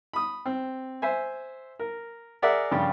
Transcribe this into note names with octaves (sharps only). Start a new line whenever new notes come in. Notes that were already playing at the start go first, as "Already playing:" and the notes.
B5 D#6
C4
C5 E5 G#5
A#4
G#4 A#4 D5 E5 F#5
G2 C#3 F3 G3 F4 G4